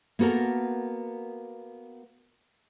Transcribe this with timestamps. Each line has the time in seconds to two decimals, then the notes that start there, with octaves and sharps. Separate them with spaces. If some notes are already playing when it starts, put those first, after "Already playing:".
0.19 A#3 B3 F#4 A4 A#4